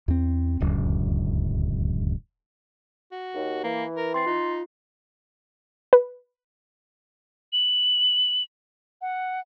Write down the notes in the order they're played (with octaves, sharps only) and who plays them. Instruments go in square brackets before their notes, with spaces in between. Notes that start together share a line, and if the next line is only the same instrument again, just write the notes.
[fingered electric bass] E2 C4
D1 C#2 F#2
[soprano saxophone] F#4
[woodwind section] D#2
[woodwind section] E3 [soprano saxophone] A#3
[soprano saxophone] A#4
[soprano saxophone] C4 [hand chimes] C6 A6 C7
[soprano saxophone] D#4 [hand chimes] F4
[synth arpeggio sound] B4
[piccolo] F#7
F#5